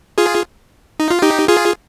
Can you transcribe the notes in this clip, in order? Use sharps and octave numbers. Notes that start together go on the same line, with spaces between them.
F4 G#4
D#4
F4
D#4 G4
F4 G#4